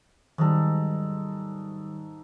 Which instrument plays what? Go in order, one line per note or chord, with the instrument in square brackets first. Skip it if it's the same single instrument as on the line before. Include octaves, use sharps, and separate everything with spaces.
[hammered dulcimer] G#2 A4 [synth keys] D#3 F#3 G3